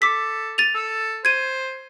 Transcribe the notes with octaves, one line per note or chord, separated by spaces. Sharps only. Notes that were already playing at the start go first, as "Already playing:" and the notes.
A4 D6 B6
A6 D#7 F7
A4
C5 G#6 D#7